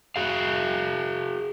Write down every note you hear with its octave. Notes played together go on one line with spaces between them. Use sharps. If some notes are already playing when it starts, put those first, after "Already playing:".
F#4 G#4 F5